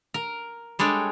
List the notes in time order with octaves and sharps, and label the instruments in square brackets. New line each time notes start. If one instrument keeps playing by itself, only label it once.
[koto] A#4
G3 G#3 D4 A4 C#5